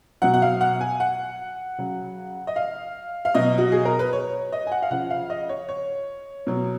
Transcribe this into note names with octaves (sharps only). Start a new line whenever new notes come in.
B2 F#3 F#5
F#5
F5
F#5
G#5
F#5
C#3 F#3
D#5
F5
F5
B2 F#3 D#5
F#4
G#4
A#4
B4
C#5
D#5
G#5
F#5
F5
C#3 F3 F#5
F5
D#5
C#5
C#5
B2 F#3